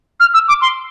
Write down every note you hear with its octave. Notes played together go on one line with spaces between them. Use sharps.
F6
E6
D6
C6